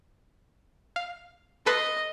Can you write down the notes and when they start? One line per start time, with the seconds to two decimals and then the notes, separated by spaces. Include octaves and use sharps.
0.96 F5
1.66 A4 B4 D#5 C6